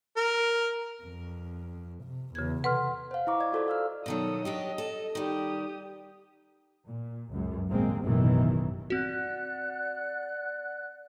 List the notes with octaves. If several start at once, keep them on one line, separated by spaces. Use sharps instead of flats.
A#4
F2
C3
E2 C#3 F#4 G#6
C3 A4 B4 F#5 C6 F6
C5 F5
E4 D#5 A#5 C#6 D6
D5 D#5 G#6
F4 F#4 A4 C5 D5 D#5
F5 E6 F6
B2 D#3 F#3 A4 D#6
F#3 D4 G4 D#5
A4
D#3 G3 G4 D#6
A#2
C#2 F#2
G#1 A#2 G#3 A#3 C4
A1 F#2 B2 D#3 E3
C4 F#4 D5 F#5 F#6